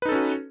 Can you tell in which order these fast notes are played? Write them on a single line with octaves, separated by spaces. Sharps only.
B4 D#4 A4 C#4 F#4